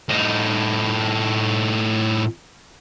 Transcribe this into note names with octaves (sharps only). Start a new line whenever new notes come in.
A2 D#4